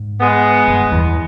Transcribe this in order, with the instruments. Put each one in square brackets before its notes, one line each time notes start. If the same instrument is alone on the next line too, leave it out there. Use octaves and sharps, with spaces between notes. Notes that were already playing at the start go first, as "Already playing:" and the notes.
Already playing: [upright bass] G#2
[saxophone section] G#3 B3
[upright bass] G2
E2